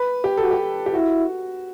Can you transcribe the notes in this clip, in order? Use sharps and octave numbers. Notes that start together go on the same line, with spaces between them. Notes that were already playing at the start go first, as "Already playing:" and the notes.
Already playing: B4
G4
F#4 A4
G4
G4
E4 F#4